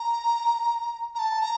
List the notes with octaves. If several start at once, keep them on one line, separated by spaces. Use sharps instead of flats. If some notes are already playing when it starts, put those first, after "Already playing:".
Already playing: A#5
A#5
A5
A#5